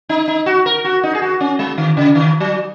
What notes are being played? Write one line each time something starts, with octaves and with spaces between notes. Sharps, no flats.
D#4
D#4
F#4
A#4
F#4
D#4
G#4
F#4
C#4
G#3
D#3
C#3
D#3
F#3